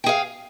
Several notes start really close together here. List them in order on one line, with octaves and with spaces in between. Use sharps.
G5 G#4 F5